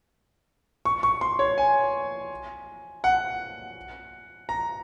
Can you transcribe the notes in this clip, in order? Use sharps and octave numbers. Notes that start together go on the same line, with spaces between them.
C#6
C#6
C6
C#5
G#5
F#5
A#5